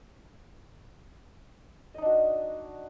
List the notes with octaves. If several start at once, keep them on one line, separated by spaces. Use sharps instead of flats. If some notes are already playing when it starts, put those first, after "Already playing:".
D4 D#4 F#4 D#5